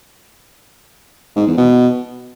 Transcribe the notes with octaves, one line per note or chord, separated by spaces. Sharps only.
G#2
E2
B2